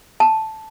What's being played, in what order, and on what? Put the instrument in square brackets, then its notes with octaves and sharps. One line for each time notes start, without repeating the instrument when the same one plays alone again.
[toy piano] A5